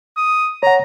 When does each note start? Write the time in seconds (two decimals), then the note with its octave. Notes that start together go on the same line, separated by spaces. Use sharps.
0.17 D#6
0.63 C#5 F#5 A#5